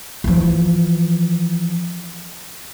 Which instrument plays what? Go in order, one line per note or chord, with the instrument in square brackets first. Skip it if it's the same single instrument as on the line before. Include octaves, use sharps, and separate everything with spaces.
[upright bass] E3 F3